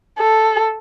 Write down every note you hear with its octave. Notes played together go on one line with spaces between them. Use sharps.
A4